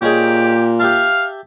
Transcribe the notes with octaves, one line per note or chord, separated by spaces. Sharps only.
A#2 C#4 D#4 G4 G#4
G4 E5 F5 A5